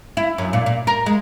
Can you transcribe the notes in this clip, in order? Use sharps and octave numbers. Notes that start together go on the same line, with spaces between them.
E4
F#2
A#2
A#2
A#4
G#3